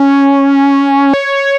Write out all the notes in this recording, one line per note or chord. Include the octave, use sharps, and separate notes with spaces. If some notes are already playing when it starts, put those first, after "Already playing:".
Already playing: C#4
C#5